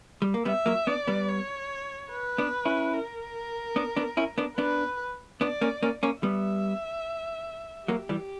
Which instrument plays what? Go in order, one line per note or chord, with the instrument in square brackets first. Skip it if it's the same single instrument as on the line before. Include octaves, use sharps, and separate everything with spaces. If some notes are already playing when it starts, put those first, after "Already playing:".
[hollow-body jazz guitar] G3
A#3
[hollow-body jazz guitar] G3 B3 [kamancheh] E5
[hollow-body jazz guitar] F#3 A#3
[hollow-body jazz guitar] B3 D4 [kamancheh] D5
[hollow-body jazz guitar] G3 B3
[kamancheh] C#5
B4
[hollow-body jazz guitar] B3 D4
C#4 E4
[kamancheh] A#4
[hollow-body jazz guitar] B3 D4
B3 D4
C#4 E4
B3 D4
[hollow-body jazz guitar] B3 D4 [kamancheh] B4
[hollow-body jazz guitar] B3 D4 [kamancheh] D5
[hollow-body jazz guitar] A#3 C#4
A#3 C#4
A#3 C#4
[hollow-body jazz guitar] G3 B3 [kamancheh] E5
[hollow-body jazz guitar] F#3 A#3 [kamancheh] G4
[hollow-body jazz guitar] E3 G3